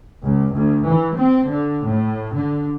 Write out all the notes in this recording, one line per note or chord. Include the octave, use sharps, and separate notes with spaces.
C#2
D2
E3
C4
D3
A2
D3